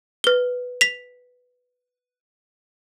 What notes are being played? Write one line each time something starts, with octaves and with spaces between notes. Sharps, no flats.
B4 G7
B6 F7